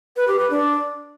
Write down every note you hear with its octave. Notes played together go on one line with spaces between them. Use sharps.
B4
G4
B4
D4